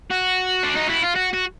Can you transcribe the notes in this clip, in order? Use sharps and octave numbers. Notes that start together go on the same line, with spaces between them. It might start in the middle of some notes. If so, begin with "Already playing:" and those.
F#4
D4
D#4
E4
F4
F#4
F#4